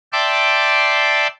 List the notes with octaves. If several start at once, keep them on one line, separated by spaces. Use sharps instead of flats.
D5 E5 G5 A5 C6 D6